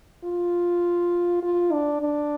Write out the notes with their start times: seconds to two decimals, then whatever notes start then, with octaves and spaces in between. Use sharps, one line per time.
0.24 F4
1.42 F4
1.72 D4
2.02 D4